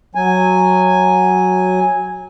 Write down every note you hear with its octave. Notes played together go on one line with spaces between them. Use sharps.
F#3 G#5